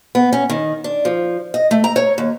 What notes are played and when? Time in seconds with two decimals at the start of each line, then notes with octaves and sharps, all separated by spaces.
0.15 B3
0.33 C#4
0.50 D#3
0.84 D4
1.05 F3
1.54 D#5
1.71 A3
1.84 A#5
1.96 C#5
2.18 D#2